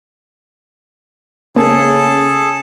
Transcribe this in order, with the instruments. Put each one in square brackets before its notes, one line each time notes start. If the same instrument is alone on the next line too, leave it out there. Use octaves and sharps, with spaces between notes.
[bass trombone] C#3 [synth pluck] A#3 [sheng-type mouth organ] G#4 A4 A5